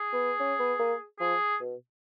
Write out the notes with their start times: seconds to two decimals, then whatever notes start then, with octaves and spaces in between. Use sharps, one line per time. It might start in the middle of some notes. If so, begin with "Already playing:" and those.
Already playing: G#4
0.13 B3
0.40 C#4
0.60 B3
0.79 A#3
1.20 F3 G#4
1.61 B2